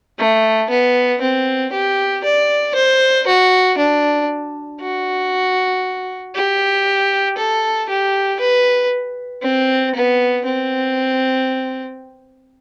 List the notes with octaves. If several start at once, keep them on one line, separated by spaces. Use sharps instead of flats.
A3
B3
C4
G4
D5
C5
F#4
D4
F#4
G4
A4
G4
B4
C4
B3
C4